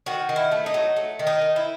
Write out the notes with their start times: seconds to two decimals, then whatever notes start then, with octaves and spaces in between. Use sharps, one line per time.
0.06 D#3 F#4
0.29 D#3
0.36 E4
0.52 A3
0.66 D#4
0.74 F#3
0.96 A3
1.19 D#3
1.27 D#4
1.41 D#3
1.56 E4